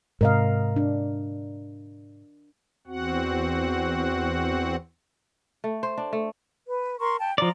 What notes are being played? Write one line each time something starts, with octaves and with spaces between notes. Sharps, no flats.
G#2 C3 A#4 D#5 F5
D4
E2 C4 F#4 F#5
A3
C5
D4
A3
B4
A#4 C6 C#6
G5 A5
F3 D5 A#5